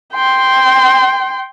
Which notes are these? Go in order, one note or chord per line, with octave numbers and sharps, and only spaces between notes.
G5 C6